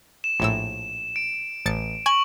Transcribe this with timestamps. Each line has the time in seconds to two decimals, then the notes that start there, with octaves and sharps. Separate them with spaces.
0.24 E7
0.40 A#1 A2 E6
1.16 D7
1.66 A1 A6 C#7
2.06 G#5 C#6 F#7